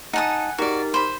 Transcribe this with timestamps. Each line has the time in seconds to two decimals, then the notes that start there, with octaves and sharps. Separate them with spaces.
0.13 D#4 F#5 G#5 A5 D#6 F#6
0.58 D#4 F#4 G4 A#4 D5
0.94 C5 B5